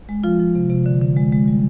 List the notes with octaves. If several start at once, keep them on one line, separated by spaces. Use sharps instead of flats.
G#3
F3 F4
F3
C3
C3
D3
D3
G#3
G#3
G3